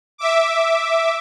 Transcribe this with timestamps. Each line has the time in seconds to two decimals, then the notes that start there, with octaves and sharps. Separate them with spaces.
0.18 E5 D6